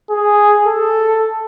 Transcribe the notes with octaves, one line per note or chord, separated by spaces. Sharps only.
G#4
A4